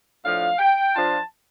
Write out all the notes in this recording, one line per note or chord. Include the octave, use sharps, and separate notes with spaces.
A2 F3 D4 F5
G5
F3 D4 F4 A5